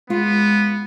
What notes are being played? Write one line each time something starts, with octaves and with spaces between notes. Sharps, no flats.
G#3 B3 F4